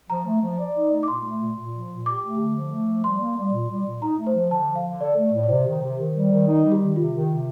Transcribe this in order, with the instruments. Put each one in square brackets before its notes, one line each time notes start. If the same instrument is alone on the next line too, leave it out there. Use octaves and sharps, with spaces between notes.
[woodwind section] F3 [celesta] A#5
[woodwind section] A3
F3
D5
D#4
A3
[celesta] D6
[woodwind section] A#2 [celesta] C6
[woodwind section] A3
A#2
A#2
F3
A#2
[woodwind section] G4 [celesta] D6
[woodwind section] A3
D3
F3
A3
F3
[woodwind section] G3 [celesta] C6
[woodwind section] A#3
G3
A#2
G3
A#2
[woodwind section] D#4 [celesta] A#5
[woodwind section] A3
[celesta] C5
[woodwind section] F3
[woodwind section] D3 [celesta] A5
[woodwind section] F3
[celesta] F5
[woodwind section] D3
[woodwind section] A4 [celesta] D5
[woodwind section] A3
A2
[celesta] D5
[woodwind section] C3 [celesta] C5
[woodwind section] D#3
C3
D#3
G3
D#3
D#4
G3
[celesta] G4
[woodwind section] D#3
[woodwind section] C3 [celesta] F4
[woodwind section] D#3
C3